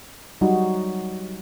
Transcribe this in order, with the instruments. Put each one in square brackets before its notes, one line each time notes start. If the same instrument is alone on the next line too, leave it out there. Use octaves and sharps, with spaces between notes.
[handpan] F#3 G3 D#4 F#4